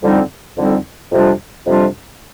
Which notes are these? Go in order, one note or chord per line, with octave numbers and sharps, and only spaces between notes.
F2 D3 G3 C4 D#4
F2 D3 G3 C4 D#4
F2 C3 G3 D4 F4
F2 C3 G3 D4 F4